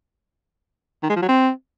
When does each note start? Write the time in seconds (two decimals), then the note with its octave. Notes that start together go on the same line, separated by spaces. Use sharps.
1.03 D#3
1.09 G#3
1.16 F3
1.22 F#3
1.29 C4